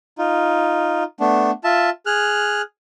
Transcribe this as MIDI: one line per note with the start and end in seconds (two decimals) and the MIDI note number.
0.18 1.03 63
0.18 1.03 65
1.20 1.51 57
1.20 1.51 59
1.20 1.51 62
1.64 1.90 65
1.64 1.90 76
1.64 1.90 81
2.06 2.62 68
2.06 2.62 89
2.06 2.62 90